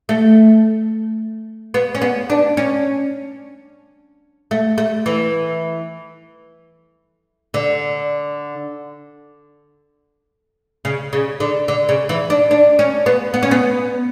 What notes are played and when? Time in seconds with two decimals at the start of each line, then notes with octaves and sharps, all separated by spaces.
0.09 A3
1.74 B3
1.95 C#4
2.01 B3
2.30 D4
2.57 C#4
4.51 A3
4.78 A3
5.06 E3
7.54 D3
10.85 C#3
11.13 C#3
11.40 D3
11.68 D3
11.89 C#3
12.09 E3
12.30 D4
12.51 D4
12.79 C#4
13.06 B3
13.34 B3
13.43 C#4
13.51 B3